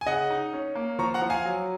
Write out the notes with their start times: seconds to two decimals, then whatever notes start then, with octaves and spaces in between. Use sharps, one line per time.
0.01 G#5
0.06 C#3 D#5 F#5
0.30 D#4
0.53 C#4
0.75 A#3
0.99 F3 A#5 C#6
1.14 F#5 A#5
1.22 F3
1.30 F5 G#5
1.45 F#3